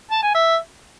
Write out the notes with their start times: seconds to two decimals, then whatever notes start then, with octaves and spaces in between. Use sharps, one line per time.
0.11 A5
0.23 G#5
0.34 E5